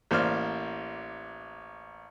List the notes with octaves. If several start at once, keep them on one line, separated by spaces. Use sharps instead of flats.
A1 A#3 C5 D5 F6